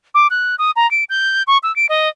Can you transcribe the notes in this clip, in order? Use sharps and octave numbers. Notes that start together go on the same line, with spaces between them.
D6
F#6
D#6
A#5
D7
G6
C#6
E6
D7
D#5